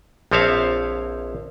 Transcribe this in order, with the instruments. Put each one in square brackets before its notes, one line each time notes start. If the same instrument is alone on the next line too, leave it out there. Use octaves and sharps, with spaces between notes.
[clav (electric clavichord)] A#1 F3 C4 C#5 E5 F5